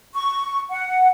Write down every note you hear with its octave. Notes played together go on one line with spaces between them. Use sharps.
C#6
F#5